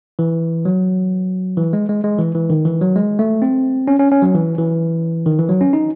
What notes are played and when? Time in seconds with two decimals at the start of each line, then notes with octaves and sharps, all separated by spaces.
0.19 E3
0.65 F#3
1.57 E3
1.73 G#3
1.89 G#3
2.04 G#3
2.18 E3
2.35 E3
2.50 D#3
2.65 E3
2.81 F#3
2.96 G#3
3.19 A3
3.42 C4
3.88 C#4
3.99 C#4
4.12 C#4
4.22 F#3
4.34 E3
4.58 E3
5.26 D#3
5.39 E3
5.49 F#3
5.61 C#4
5.73 D#4